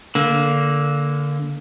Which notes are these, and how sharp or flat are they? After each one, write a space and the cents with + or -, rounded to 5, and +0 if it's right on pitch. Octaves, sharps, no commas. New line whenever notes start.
D3 -15 A#3 +0